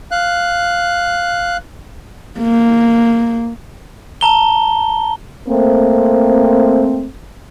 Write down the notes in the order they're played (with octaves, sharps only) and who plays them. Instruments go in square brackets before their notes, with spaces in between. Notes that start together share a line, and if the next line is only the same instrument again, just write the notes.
[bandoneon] F5 F#6
[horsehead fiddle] A#3
[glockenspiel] A5 A#5 G7
[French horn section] A3 A#3 C4